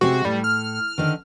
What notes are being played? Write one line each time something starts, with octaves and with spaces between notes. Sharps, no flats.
C3 G#3 C4 F#4
A2 G3
F6
D3 D#3